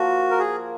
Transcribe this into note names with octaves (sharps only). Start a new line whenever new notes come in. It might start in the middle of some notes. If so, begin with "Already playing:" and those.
Already playing: F3 A#3 F4 F#4
A#4
G#4